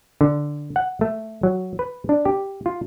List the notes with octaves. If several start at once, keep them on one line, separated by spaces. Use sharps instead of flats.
D3
F#5
A3
F#3
B4
D4
G4
F4